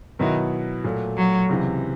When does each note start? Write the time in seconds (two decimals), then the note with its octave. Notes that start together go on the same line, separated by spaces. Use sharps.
0.19 B2 D#3 F#3 B3 E4
0.84 A#2 F#3 A3
1.17 F#3
1.49 C#2 C3 E3